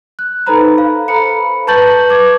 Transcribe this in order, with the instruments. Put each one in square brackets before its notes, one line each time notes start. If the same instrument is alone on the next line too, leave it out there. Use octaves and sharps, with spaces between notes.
[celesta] F#6
D#4 A4 B4 C5 A#5 B5
F5
A4 C5 F5 A#5 B5 C#7
B4 A5 C#6 G6 A6 F#7
B4 D6 G#6